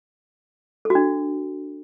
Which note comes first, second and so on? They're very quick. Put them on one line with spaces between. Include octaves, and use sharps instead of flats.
A4 F#4 D4